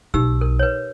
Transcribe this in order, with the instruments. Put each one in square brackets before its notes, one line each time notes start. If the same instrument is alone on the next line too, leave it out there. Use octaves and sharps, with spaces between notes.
[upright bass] B1 [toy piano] D#4 G4 E6
[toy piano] A#4
B4 C#5